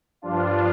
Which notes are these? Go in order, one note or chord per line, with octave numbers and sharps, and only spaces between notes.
G2 F3 D4 F4